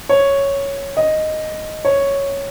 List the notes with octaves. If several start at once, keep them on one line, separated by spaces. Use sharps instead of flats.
C#5
D#5
C#5